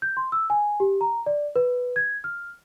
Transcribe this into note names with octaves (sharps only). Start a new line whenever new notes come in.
G6
C6
E6
G#5
G4
A#5
D5
B4
G#6
F6